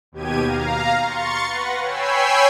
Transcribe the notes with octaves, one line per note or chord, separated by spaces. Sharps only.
D#2 B2 G4 G#6 D#7
F5 A#5
C6 C#6 A6 C#7
B4 F#5 A#6
C#5 G5 G#5 B5 E6 C7